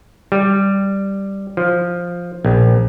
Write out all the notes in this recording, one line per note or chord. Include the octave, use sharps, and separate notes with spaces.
G3
F3
A#1